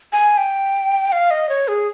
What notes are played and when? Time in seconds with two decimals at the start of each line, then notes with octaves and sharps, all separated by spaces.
0.12 G#5
0.37 G5
1.12 F5
1.31 D#5
1.49 C#5
1.68 G#4